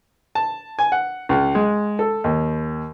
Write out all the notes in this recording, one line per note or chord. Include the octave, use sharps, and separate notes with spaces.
A5
G#5
F#5
C#2
G#3
A4
D#2